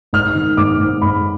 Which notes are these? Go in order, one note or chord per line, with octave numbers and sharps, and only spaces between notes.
G#2 F6
D#3
G#2 D6
G#2
G#2 B5